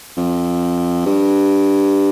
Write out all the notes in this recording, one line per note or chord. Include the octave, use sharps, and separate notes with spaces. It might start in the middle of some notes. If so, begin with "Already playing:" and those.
F2
G2